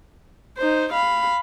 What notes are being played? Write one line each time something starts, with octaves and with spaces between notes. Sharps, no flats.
D#4 C5
F5 B5